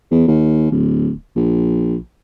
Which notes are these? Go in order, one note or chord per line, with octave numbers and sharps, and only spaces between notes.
E2
D#2
D1
A#1